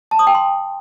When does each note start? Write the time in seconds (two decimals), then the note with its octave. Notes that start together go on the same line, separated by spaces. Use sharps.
0.11 A5
0.19 D#6
0.27 G5
0.35 C6